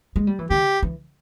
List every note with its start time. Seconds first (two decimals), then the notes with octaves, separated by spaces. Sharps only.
0.16 G#3
0.27 G3
0.39 E3
0.50 D#3 G4
0.83 E3